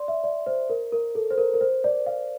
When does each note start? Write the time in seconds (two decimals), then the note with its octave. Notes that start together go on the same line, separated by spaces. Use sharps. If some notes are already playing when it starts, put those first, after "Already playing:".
Already playing: D5 C6
0.08 E5
0.23 D5
0.46 C5
0.70 A#4
0.92 A#4
1.15 A4
1.31 C5
1.38 A#4
1.54 A#4
1.61 C5
1.84 D5
2.06 F5